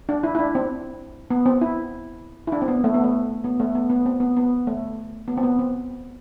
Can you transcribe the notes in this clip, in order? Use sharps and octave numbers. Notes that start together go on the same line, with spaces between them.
D4
E4
E4
D4
C4
B3
C4
E4
E4
D4
C4
B3
A3
B3
A3
B3
A3
B3
B3
C4
B3
B3
A3
B3
C4
B3
C4